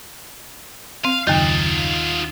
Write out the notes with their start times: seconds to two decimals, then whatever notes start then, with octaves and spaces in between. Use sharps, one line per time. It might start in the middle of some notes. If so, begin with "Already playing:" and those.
1.05 C4 F5
1.27 F#1 D#2 D#3 D#4 F4